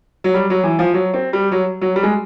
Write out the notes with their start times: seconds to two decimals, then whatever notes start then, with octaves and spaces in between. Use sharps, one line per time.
0.24 F#3
0.34 G3
0.50 F#3
0.64 E3
0.79 F3
0.94 F#3
1.14 C4
1.33 G3
1.52 F#3
1.81 F#3
1.96 G3
2.03 G#3